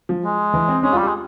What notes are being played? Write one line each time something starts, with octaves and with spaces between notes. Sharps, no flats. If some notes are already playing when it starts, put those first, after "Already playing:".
F3
G#3
E3
C4
G#3 C#4
F4
G3 G4
G#3